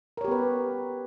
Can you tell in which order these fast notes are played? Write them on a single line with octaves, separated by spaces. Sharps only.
A#4 C#5 G4 B3 B4